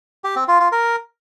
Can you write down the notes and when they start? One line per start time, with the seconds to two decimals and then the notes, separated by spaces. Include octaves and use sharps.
0.24 G4
0.36 C4
0.48 F4
0.60 F4
0.72 A#4